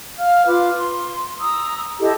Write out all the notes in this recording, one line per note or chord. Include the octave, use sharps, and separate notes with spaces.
F5 F6
F4 B4 D6
C6
A#5 D#6 E6
E4 G4 A4 D#5